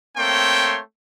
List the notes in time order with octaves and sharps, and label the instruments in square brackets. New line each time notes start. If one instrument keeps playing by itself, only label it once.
[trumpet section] A3 A#3 C4 C#5 G5 C6